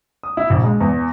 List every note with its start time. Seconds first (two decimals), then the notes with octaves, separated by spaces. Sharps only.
0.23 D#6
0.37 E4
0.50 A#1
0.64 G#3
0.81 E2